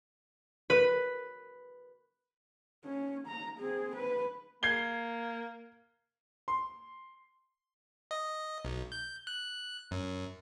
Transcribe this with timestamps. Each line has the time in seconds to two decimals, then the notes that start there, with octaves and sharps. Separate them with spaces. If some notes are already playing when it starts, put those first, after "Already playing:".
0.70 B4
2.84 C#4
3.28 A#5
3.59 C4 G#4
3.96 B4
4.63 A#3 G#6 C7 G7
6.48 C6
8.11 D#5
8.65 B1
8.92 G6
9.27 F#6
9.91 F#2